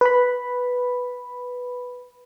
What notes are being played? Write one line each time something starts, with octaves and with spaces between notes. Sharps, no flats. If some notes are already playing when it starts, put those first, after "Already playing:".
B4 B5